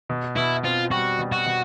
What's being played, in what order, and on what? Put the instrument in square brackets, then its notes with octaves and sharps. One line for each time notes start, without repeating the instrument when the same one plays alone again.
[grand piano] B2
[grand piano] B2 [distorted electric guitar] E4
[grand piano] C4 [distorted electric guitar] F4
[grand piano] G3 [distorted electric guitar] F#4
[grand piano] B2
[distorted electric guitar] F#4
[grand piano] B2